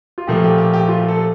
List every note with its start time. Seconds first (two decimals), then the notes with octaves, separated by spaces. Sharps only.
0.18 F4
0.27 A#2 F3 A3 G4
0.44 G4
0.58 G4
0.74 G4
0.88 F4
1.08 A4